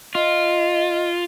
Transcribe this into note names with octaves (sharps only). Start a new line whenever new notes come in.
F4 D#5